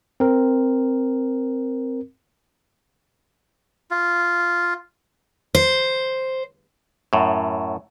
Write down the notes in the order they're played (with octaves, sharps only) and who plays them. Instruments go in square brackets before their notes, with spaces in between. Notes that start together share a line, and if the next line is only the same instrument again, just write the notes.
[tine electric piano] C4 A#4
[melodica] F4
[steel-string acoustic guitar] C5
[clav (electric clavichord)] F#2 A2